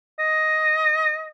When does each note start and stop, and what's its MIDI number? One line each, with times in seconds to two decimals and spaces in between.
0.19 1.31 75